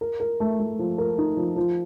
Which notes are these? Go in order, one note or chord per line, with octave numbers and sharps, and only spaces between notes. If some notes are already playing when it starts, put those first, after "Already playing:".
A#4
A#4
A3
A3
F3
A#4
D#4
F3
F3